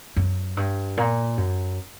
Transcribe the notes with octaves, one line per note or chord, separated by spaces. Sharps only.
F#2
G2
A#2
F#2